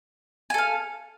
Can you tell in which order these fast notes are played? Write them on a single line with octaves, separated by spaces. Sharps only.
G#5 A4 F5